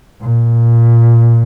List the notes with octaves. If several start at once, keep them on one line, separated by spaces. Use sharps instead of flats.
A#2